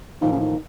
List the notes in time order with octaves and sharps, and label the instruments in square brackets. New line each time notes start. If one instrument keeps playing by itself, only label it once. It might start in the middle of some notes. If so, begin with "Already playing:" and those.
[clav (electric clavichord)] A1 A2 F3 A#3 [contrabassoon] D#3
[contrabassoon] C#3
D#3